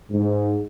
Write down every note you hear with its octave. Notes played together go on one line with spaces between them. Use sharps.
G#2